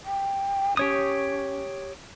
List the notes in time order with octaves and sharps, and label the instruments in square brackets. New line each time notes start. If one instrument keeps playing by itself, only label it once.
[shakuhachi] G5
[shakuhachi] C#4 [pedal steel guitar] G4 C#5 D#6